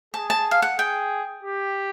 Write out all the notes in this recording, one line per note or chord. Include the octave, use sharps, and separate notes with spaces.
G#4 A5
A5
F5
F#5
G#4 G5
G4